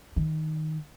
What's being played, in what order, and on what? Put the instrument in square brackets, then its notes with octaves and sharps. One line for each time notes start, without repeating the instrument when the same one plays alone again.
[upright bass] D#3